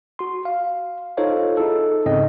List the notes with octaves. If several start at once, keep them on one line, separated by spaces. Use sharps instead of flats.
F#4 C6
F5
D#4 F4 A4 C5 C#5 F5
D#4 E4 G#4 A4
G#2 C#3 C4 D#5 G5